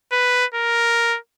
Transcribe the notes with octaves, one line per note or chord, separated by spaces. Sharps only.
B4
A#4